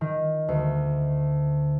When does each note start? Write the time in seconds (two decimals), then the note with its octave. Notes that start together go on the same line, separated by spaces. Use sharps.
0.01 D#3
0.48 D2